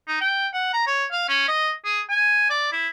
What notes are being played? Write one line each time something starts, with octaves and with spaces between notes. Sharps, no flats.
D#4
G5
F#5
A#5
C#5
F5
C#4
D#5
G#4
G#5
D5
E4